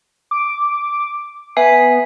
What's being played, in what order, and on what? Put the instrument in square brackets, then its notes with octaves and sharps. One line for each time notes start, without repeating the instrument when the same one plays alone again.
[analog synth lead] D6
[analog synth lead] B3 [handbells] E5 G#5 C7